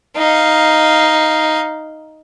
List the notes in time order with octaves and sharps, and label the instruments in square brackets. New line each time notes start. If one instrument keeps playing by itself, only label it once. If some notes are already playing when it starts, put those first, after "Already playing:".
[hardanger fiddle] D#4 F5